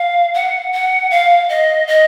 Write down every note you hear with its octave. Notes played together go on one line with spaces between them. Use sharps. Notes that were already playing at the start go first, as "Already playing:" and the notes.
Already playing: F5
F#5
F#5
F5
D#5
D#5